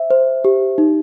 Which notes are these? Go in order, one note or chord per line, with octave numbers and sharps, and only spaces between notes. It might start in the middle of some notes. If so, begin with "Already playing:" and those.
Already playing: C5 E5
C5
G4
D#4